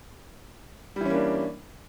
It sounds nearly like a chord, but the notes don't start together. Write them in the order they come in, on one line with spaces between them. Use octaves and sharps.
G3 E3 C#4 A#3 D4